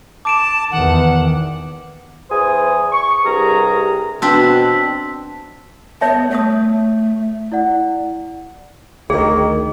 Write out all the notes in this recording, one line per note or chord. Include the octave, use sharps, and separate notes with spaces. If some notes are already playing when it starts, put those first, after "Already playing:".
A5 D6 D7 E7
E2 D#3 F#5
E2 C5 G#5 D#6
C#6
C2 G2 G#4 A#4 A#5
B2 C4 D4 A5 E6 B6
B3 C#5 E5 A5
A3 C#5 D#6
E4 D5 F#5
D2 D#3 G#4